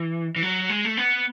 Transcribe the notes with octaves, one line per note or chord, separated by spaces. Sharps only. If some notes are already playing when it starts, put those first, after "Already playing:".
Already playing: E3
E3
F#3
G#3
A3
B3